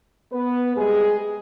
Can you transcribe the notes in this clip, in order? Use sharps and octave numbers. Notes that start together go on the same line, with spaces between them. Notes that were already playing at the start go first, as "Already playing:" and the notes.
B3 B4
C3 G3 G#3 G#4